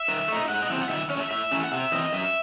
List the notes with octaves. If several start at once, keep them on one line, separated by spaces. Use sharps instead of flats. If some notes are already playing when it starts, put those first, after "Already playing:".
Already playing: E5
D#3
A3 D#4
G#2 F#5
D#5
E3 C4 E5
F#5
D#3 E5
A3 C#4 C#5
E5
A2 E5
E3 A3 C#4
F#5
C3 E5
E3 C4 D#5
F#2 E5